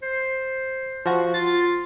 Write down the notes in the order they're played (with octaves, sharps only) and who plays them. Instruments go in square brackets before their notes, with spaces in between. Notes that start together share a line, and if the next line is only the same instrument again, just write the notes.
[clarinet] C5
[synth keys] F3 F#4
[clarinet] F4 [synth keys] A6